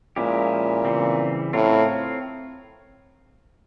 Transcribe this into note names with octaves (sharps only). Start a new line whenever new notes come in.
A#2 F3 G#3 C#4 E4 G4
C#3 E3 G3 C4
A2 C4 F4 A#4 C#5